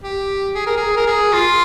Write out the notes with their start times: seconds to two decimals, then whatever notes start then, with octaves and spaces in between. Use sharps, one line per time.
0.03 G4
0.55 G#4
0.66 A#4
0.77 G#4
0.96 A#4
1.07 G#4
1.32 F4